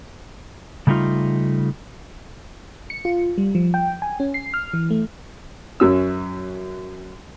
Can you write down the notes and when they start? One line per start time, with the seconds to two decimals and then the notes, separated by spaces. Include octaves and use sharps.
0.87 C#3 G3 A3 D#4 F4
2.90 C#7
3.05 F4
3.38 G3
3.55 F3
3.74 G5
4.02 G#5
4.20 C#4
4.34 C7
4.54 F6
4.73 E3
4.90 A3
5.80 F#2 F#3 C#4 E6